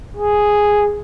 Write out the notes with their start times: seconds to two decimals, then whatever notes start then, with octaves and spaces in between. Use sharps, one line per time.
0.17 G#4